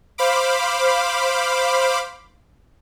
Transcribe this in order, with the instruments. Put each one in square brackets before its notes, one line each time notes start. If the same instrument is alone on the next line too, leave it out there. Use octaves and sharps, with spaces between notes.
[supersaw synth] C5 F5 B5 D6